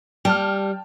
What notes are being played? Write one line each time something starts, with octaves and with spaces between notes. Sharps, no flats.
G3 G5 A5 F6